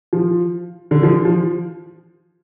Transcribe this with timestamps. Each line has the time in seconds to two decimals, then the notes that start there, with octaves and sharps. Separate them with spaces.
0.13 F3
0.91 D3
1.03 F3
1.25 F3